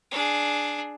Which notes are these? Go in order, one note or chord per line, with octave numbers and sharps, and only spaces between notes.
D4 G#4